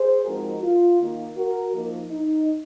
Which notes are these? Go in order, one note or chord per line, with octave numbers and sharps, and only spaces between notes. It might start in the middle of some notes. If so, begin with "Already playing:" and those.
Already playing: G#4 C5
F3 G#3 C4 D#4 F#4 A#4
F4
D#3 A#3 D#4
F#4 A#4
F3 A#3 D#4
D#4